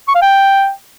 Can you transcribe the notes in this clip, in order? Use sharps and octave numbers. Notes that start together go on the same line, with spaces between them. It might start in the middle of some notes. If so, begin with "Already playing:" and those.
C#6
F5
G5